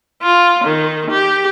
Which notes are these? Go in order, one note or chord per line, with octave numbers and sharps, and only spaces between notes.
F4
D#3
G4